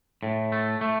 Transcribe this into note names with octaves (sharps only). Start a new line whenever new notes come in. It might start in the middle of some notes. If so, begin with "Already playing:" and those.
A2
A3
A3